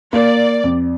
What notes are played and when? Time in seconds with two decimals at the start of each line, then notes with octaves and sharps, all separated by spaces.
0.13 A#3 D5
0.64 F2